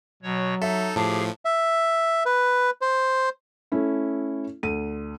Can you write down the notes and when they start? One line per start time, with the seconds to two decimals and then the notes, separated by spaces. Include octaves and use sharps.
0.23 B2 F#3 C#5
0.62 D#4 A4 E5
0.96 A2 F3 G4 G#4 A5
1.45 E5
2.26 B4
2.81 C5
3.72 A3 C#4 E4
4.63 D2 D#7